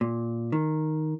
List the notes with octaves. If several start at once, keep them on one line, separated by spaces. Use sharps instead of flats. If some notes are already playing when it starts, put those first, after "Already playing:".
A#2
D#3